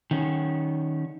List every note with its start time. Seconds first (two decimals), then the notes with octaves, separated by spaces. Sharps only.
0.11 D#3 C#4